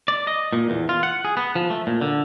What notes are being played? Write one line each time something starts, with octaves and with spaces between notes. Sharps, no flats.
D5
D#5
A#2
E2
F4
F#5
G#4
B3
F3
A3
A#2
D3